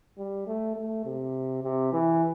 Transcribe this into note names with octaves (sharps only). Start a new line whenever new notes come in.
G3
A3
A3
C3
C3
E3